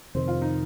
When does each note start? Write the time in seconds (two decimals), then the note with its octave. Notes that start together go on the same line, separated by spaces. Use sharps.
0.15 F2 C3 D#3 C4
0.28 F4
0.42 D#4